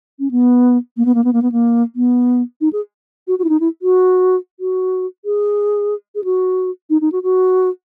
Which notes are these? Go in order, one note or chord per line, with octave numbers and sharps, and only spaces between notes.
C#4
B3
A#3
B3
A#3
B3
A#3
B3
A#3
B3
D#4
G#4
F#4
F#4
E4
D#4
E4
F#4
F#4
G#4
G#4
F#4
D#4
D#4
F#4
F#4